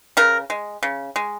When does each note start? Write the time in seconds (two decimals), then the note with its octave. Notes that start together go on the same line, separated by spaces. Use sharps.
0.17 C#3 A#4
0.50 G#3
0.83 C#3
1.16 G#3